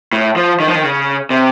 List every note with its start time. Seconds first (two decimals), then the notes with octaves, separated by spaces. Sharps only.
0.13 A2
0.36 F3
0.60 D#3
0.68 F3
0.75 D#3
0.84 C#3
1.30 C3